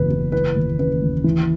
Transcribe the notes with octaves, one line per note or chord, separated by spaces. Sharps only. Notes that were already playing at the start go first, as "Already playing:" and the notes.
Already playing: F#1 E2 B2 B4
F#1
E3 B4
D#2
C#3 B4
D#2
E3